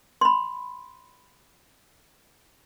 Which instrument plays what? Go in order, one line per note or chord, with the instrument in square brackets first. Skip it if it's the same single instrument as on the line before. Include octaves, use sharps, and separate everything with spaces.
[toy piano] B5 C6